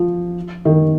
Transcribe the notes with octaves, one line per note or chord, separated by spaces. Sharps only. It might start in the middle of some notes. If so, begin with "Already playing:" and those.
Already playing: F3
D#3